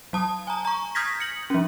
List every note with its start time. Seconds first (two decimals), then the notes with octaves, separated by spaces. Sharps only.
0.13 F#3 A5 D#6
0.47 G#5 A#5
0.65 A#5 C#6
0.95 D#6 F6 G6 G#6 A#6 B6
1.20 C#7 F#7
1.50 F3 C#4